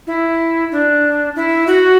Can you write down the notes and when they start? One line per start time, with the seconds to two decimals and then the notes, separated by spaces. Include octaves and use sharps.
0.07 E4
0.72 D4
1.36 E4
1.67 F#4